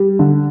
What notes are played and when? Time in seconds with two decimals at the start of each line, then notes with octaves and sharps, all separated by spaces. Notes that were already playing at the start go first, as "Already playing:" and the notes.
Already playing: G3
0.19 D3